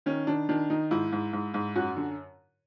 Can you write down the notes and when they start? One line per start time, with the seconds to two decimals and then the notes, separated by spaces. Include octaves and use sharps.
0.06 D#3 C#4
0.27 D#3 D4
0.49 D#3 D4
0.70 D#3 D#4
0.91 G#2 E4
1.12 G#2
1.33 G#2
1.54 G#2
1.75 F#2 F#4
1.96 D3